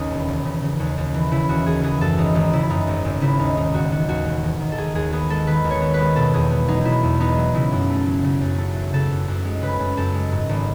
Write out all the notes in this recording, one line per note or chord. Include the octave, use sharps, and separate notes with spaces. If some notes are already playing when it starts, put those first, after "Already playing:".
Already playing: D#2 C#3 D#4
E1
E1
C#3
C#3
D#2
D#2
E3
C#3 E4
D#2 F#4
D#2 G#4
E3 G#4
F#2 A4
G#1 D#4
G#1 D#4
C#3 E4
F#2 D#4
G#1
G#1
C#3 E4
D#2 D#4
E1 D#4
E1 F#4
D#3 F#4
D#2 F#4
E1
E1
D#3
A4
D#3 G#4
D#2 G#4
B3 G#4
G#3 A4
D#3 B4
D#2
C#5
B3
B4
G#3
B2 A4
E2 G#4
B3
F#3 D#4
B2 D#4 E4
E2
B3 D#4
F#3
C#3 E4
F#2
A3
F#3
C#3
F#2
A3
F#3
C#3 A4
F#2
F#2
G#3
C#3 B4
F#2
F#2 A4
G#3
G#2
G#1